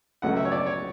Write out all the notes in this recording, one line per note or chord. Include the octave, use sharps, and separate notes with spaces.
C#2 C#3 F#3 A3 F#5
E5
C#5
D5
C#5